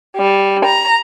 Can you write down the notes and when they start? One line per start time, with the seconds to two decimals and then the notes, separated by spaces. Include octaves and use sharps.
0.16 G3
0.66 A#5